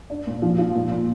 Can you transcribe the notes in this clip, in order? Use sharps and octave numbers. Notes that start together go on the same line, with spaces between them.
D4
A#2
F3
F4
A#2
A#2